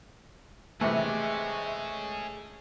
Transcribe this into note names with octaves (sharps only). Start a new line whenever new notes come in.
C3 E3 G#3 A3 G#4 C#5